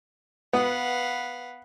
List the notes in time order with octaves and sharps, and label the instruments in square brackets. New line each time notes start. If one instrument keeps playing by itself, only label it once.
[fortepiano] B3 [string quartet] B4 F5 F#5